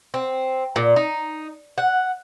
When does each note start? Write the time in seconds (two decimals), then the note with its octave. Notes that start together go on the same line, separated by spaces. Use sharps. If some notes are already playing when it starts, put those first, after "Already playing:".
0.14 C4
0.76 A#2
0.96 D#4
1.78 F#5